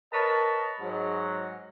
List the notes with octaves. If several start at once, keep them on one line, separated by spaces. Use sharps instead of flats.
A#4 B4 C#5 D#5 A5
G#2 F#3